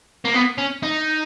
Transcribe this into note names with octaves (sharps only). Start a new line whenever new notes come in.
A#3
B3
C#4
D#4